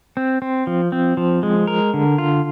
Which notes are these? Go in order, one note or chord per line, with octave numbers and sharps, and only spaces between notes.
C4
C4
F3
C4
F3
G#3
A#4
D3
F4